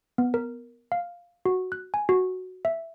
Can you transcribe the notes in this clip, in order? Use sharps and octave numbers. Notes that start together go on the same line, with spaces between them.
B3
A#4
F5
F#4
F#6
G#5
F#4
E5